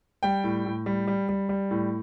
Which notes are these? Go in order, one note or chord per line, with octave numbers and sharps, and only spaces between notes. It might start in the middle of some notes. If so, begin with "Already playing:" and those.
G3 G5
A2
A2
G3
G3
G3
G3
A2